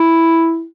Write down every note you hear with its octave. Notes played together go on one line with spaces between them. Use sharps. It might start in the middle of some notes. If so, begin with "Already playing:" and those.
Already playing: E4